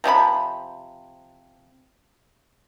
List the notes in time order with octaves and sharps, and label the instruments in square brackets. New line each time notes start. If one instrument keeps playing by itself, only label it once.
[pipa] C3 F3 D#4 B5